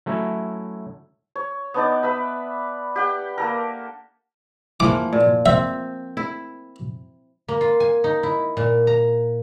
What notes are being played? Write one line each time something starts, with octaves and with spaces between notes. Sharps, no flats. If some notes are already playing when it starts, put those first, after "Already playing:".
F#3 A3 C#4 E4
C#5
B3 D4 D#4 D5
B4 E5 B5
G4 F#5 G5
A#3 A4 A#4
E3 F3 A#3 D6
A#2
C4 E5
E4
A#3
F4
G#5
D#4
E4
A#2
A#5